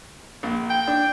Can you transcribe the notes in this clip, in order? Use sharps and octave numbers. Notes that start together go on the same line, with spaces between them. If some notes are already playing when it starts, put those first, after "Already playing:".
A#1
G5
D4